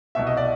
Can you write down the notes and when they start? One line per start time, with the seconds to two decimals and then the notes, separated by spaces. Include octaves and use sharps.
0.15 C2 B2 E5
0.27 D#5
0.37 D5